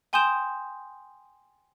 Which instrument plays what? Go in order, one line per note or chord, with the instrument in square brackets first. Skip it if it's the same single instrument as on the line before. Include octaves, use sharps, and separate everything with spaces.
[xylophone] G5 G#5 C6 D#6 G6 E7